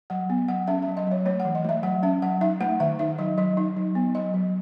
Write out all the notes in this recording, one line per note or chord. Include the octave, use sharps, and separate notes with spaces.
F#3 F#5
B3
F#3 F#5
C#4 E5
F#3 E5
D#5
F#3 C#5
A3 C#5
F#5
E3
D#5
A3 E5
F#3 F#5
C#4 E5
F#3 F#5
D#4 E5
A3 F#5
D#3 E5
D#4 E5
F#3 D#5
F#3 D#5
D#4
F#3
B3
F#3 D#5
F#3